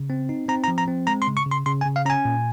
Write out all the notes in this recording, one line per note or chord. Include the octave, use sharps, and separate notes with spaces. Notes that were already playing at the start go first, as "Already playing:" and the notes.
Already playing: C#3
C4
D#4
C4 A#5
A#5
F3
A#5
C4
G#3 A#5
C6
C#3
C#6
C#3
C6
C#3 C6
G#5
C#3
F5
C#4 G#5 A#5
A#2